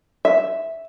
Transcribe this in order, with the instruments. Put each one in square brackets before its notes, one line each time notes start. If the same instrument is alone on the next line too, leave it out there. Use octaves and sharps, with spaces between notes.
[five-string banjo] E5